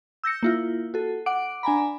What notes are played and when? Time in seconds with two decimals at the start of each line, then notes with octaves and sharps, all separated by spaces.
0.24 E6 G6 A#6 C#7
0.43 A#3 E4 F4
0.94 F#4 A4
1.26 F#5 D6 D7
1.63 D4 G#5 A#5 B5